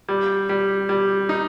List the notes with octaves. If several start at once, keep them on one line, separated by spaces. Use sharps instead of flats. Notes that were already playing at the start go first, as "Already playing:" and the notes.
G3
G3
G3
D#4